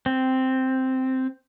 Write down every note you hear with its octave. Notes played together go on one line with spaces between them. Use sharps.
C4